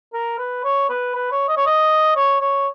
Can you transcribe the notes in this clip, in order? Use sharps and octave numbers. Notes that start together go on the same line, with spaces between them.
A#4
B4
C#5
B4
B4
C#5
D#5
C#5
D#5
C#5
C#5